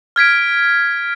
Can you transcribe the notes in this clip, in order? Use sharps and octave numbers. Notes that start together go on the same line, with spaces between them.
F6 G#6 B6 D7